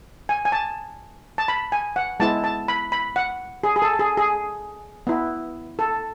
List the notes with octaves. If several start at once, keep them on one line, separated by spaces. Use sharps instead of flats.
G#5
G#5
A5
A5
B5
G#5
F#5
G#3 B3 E4 A5
A5
B5
B5
F#5
G#4
G#4
A4
G#4
G#4
B3 E4
A4